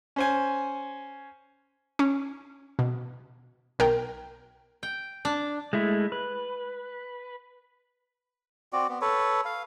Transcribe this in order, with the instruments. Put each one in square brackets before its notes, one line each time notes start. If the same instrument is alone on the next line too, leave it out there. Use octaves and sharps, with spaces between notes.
[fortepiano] C#4 C5 G#5
[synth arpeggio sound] C#4
B2
B1 A#4 G5
[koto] G5
D4
[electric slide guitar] G#3 A3 E4
B4
[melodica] C4 F#4 D5
B3
A4 B4 C#5
F5